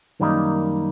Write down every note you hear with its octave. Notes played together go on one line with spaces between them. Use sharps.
F#2 D#3 G3 A#3 D#4